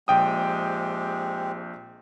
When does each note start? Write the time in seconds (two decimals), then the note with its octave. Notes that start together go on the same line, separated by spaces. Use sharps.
0.08 A#1 G#3 C4 G4 G5 D#6